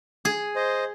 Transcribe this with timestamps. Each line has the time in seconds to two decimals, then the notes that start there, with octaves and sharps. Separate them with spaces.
0.25 G#4
0.56 C5 D#5